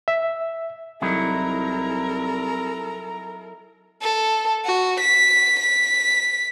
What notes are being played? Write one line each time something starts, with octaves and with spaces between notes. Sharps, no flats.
E5
C2 F#3 D#4 E4 A4 A#4 A#5
A4
F#4
B6
B6